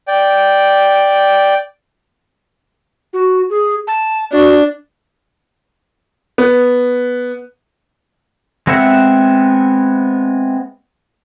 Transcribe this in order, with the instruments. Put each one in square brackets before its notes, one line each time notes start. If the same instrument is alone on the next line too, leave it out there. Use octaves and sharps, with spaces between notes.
[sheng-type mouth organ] D5 G5
[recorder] F#4
G#4
A5
[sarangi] D4 [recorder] F#4
[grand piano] B3
[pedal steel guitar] G#3 B3 C4 E5 F#5